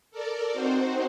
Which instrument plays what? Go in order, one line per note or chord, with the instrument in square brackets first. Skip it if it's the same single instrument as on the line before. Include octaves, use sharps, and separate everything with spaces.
[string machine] A4 A#4 D5
C4 D#4 F#4 C5